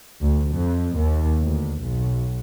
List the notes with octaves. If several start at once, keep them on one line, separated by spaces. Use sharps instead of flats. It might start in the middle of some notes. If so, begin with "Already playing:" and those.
D2
F2
D#2
D2
B1